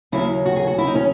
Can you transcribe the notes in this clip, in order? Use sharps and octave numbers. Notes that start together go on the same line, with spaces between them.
D#2 C#3 F#3 A#3 C#4 E4
F#4
G#4
F#4
E4
D#4
C#4